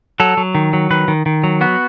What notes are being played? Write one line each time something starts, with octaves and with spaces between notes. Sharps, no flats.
F#3 A4
F#3
D#3
F#3
D#3 B4
D#3
D#3
F#3
B3 F#4